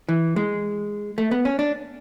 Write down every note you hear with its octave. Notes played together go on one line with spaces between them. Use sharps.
E3
G#3
A3
B3
C#4
D4